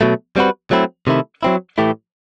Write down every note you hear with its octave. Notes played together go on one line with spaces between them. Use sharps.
B2 F#3 A3
G3 C4 F#4 B4
F#3 A3 C4 E4
C3 D#3 A3 E4
F#3 C4 E4
A2 E3 A3 E4 G4